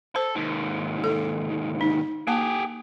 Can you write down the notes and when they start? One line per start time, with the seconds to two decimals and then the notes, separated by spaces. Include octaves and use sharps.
0.16 A4 C5
0.35 D#2 G#2
1.04 A4
1.81 D#4
2.27 A#3 G4 G#4 A5